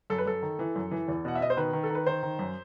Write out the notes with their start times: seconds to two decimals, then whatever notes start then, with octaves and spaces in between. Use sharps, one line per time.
0.10 F#2 A4
0.18 B4
0.26 F#2 A4
0.42 D#3
0.59 E3
0.76 F#2
0.91 E3
1.08 E2
1.25 B2 F#5
1.35 E5
1.41 B2 D#5
1.50 C5
1.57 D#3 B4
1.73 D#3
1.84 A4
1.90 D#3 B4
2.06 D#3 C5
2.23 D#3
2.39 F#2